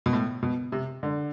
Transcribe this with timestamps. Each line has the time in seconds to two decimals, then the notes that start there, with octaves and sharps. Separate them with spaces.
0.06 B2
0.13 A2
0.43 B2
0.72 C3
1.03 D3